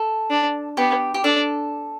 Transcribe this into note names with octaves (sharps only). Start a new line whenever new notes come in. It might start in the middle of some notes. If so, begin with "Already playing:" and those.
Already playing: A4
D4
B3 G4
G4
D4 A4